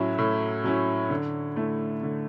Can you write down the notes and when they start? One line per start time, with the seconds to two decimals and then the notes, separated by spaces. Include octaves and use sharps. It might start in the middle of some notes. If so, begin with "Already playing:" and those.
Already playing: A2 F#3 C#4 E4
0.18 A2
0.64 F#3 C#4 E4
1.10 D3
1.56 A3 E4
2.03 D3